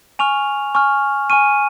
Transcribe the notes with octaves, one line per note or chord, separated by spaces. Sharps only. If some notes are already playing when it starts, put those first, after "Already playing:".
G#5 C#6 F6 F7
G#5 C#6 F6
G#5 C#6 F6 D#7